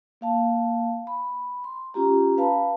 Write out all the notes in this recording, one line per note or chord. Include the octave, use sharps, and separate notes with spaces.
A#3 F5 A5
B5
C6
C#4 F4 G4 A#5
B4 F5 A5 B5